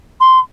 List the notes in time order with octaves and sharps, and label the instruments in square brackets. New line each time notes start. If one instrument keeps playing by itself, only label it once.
[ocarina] C6